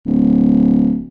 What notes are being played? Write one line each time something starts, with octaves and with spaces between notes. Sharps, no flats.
D1